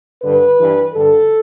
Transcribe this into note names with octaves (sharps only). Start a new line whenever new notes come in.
G2 D3 B4
G2 E3
G2 D3 A4